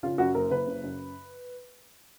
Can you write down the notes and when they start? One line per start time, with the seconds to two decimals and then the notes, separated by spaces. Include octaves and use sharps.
0.03 C#3 F4
0.18 F#2 F#4
0.35 F#1 A#4
0.50 F#1 B4
0.67 C#3
0.83 F#2